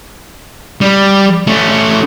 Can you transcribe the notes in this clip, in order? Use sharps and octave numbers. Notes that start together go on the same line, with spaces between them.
G3
A3 C#4